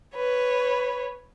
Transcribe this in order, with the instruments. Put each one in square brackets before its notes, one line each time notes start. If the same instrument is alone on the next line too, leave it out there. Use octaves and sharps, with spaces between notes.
[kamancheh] B4 C#5